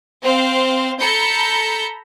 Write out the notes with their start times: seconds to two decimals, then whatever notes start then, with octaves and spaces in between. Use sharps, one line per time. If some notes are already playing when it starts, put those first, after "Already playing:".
0.23 C4 C5 F5
1.00 A4 A#5 B5 G6 C#7